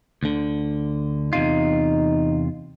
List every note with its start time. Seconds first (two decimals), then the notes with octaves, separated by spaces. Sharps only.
0.23 D2 D3
1.33 E2 C3 D#4 F4